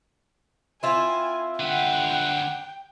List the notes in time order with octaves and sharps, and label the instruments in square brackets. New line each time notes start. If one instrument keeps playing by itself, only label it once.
[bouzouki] C4 E4 F4 [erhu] G#5
[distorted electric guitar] D3 B4 [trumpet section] F#5 [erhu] G5